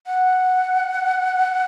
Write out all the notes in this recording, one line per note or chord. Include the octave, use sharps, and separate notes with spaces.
F#5